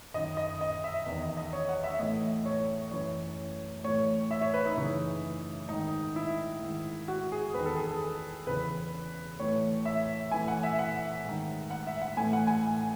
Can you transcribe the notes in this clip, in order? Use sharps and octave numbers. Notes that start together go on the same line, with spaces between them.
F#2 D#3 D#5
D#5
D#5
E5
E2 D#3
D#5
D#5
C#5
F#5
E5
A2 E3 D#5
C#5
F#2 E3 C#5
A2 E3 C#5
E5
C#5
B4
D#4
F#2 C#3 E3
G#2 D#3 D#4
E4
G#2 D#3
F#4
G#4
E2 D#3 B4
A4
G#4
A4
E2 C#3 E3 B4
A2 E3 C#5
E5
A2 E3 G#5
F#5
E5
F#5
G#2 D#3
F#5
E5
F#5
A2 E3 G#5
F#5
G#5